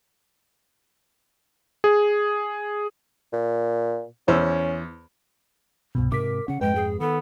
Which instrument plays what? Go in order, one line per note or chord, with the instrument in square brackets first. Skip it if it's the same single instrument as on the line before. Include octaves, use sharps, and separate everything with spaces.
[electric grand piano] G#4
[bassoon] A#2
[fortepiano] E2 C5 E6 [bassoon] C#4
[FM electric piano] C2 G2 B2
[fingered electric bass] G#2 C3 [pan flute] A#4 [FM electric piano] D6 B6
[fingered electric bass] C#3 C#4 [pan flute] F#5
[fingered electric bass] F2 G#2 [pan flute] G#3 [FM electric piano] B4 [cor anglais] G5
[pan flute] G#4
[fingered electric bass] D#3 [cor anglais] B3 [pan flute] A4